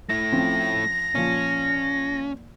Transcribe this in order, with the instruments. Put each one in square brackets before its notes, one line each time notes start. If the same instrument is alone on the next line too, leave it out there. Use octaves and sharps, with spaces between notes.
[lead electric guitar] A3 E4 [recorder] A#6
[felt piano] F3 C4 C#4
[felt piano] A#2 F3 [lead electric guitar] C#4